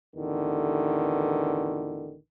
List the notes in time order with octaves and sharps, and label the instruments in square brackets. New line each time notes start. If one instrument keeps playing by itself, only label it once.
[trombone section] A1 E2 D3 D#3